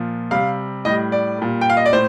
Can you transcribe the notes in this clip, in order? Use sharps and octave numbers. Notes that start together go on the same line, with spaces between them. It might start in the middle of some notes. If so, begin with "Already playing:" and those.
Already playing: A#2 F3
C3 G3 F5
A2 G3 D#5
D5
A#2 G3
G5
F5
D#5
D5
A2 C5